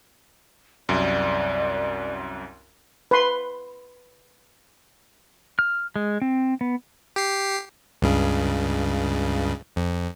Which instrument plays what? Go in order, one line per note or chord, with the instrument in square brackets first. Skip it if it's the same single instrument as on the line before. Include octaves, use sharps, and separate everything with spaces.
[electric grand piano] C2 F#2 [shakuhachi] D5
[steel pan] B4 C6
[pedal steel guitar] F6
G#3
C4
B3
[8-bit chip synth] G4 C7
C#2 G2 C#3
F2